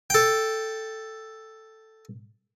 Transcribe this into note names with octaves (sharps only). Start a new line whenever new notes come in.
A4 G5